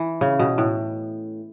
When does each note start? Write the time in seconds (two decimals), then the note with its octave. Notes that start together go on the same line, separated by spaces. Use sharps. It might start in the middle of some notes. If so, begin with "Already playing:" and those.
Already playing: E3
0.21 C#3
0.39 B2
0.58 A2